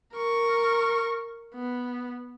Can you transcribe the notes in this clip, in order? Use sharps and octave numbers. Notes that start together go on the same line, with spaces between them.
A#4 C#6
B3